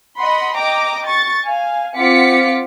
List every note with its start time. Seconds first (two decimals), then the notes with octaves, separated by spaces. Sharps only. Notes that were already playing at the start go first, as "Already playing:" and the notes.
0.19 D#5 F#5 B5 C6
0.57 D#5 G5 A#5 D6
1.06 C#6 A6
1.45 F5 G#5
1.97 C4 F4 F#5 D6 B6 C#7